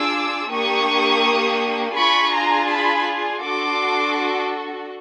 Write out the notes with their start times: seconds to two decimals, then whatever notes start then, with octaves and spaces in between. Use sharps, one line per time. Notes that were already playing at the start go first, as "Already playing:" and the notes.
Already playing: D4 F4 G#4 D6 E6
0.50 A#3 D4 G4 C#6 D#6
1.96 D4 F4 G#4 B5 C#6
2.33 A#5 C6
2.69 A5 B5
3.42 D4 F#4 A4 C6 D6